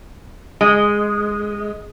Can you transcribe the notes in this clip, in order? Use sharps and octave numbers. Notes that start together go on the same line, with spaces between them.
G#3